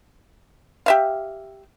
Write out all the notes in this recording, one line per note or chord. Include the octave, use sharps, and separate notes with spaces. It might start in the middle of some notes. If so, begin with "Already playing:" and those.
G4 E5 F5